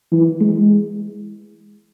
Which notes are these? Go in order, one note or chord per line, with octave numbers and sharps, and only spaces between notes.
E3
G#3